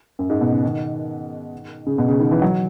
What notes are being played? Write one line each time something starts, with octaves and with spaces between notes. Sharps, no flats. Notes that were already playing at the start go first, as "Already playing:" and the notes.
F#2
G#2
B2
C#3
D#3
C#3
B2
C#3
D#3
E3
F#3